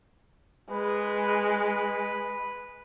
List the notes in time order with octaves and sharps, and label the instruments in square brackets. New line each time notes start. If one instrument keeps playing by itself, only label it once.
[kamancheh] G#3 [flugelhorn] B4